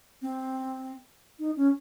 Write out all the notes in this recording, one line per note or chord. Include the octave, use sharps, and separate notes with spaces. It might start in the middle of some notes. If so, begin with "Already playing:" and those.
C4
D#4
C#4